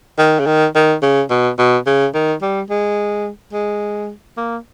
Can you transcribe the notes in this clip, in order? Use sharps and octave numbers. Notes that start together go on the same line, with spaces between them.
D#3
C#3
D#3
D#3
C#3
B2
B2
C#3
D#3
G3
G#3
G#3
A#3